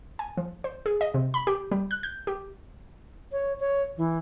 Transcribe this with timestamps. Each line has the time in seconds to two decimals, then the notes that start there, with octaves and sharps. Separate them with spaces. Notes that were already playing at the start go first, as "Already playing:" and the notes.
0.19 G#5
0.37 F3
0.64 C5
0.86 G#4
1.01 D#5
1.14 C3
1.34 B5
1.47 G4
1.71 G3
1.91 F#6
2.03 G6
2.27 G4
3.32 C#5
3.60 C#5
3.97 E3